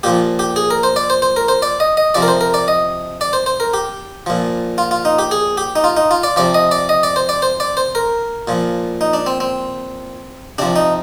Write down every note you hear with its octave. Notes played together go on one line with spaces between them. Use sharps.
A#2 F3 G4
G4
G#4
A#4
C5
D5
C5
C5
A#4
C5
D5
D#5
D#5
C3 F3 D5
A#4
C5
A#4
D5
D#5
D5
C5
C5
A#4
G4
A#2 F3
F4
F4
D#4
G4
G#4
G4
D#4
F4
D#4
F4
D5
C3 F3 D5
D#5
D5
D#5
D5
C5
D5
C5
D5
C5
A#4
A#2 F3
D#4
D4
C4
C4
C3 F3 D4
D#4